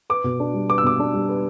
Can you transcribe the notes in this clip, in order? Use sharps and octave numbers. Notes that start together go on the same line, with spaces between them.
B4 D6
B2
D4
G3
B4 D6
E6
B2 D6
D4
G3
B4